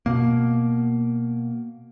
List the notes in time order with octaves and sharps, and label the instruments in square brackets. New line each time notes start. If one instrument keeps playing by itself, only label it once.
[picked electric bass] B2 A#3